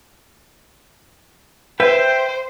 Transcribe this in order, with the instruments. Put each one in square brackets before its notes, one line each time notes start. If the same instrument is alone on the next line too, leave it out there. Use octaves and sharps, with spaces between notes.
[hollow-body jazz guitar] B4 [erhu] C5 [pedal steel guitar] E5 G5